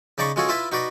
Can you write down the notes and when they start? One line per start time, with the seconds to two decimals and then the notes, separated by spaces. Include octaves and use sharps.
0.18 C#3 D#4 D5 A5 B5 C#6
0.36 G#3 C#4 F4 F#4 G#4 A4
0.49 E4 F4 B4 E5 A5
0.72 D#4 F#4 B4 D5